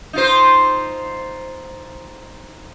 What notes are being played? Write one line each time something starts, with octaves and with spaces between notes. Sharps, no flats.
D#4 F4 C5